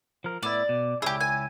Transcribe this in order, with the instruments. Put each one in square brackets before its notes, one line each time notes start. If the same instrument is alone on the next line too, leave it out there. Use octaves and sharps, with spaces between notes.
[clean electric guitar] F3 A#4
[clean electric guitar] A2 B3 E4 [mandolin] D5
[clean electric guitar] B2
[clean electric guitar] C#2 C#4 E4 [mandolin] G4 G#4
[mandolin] G#5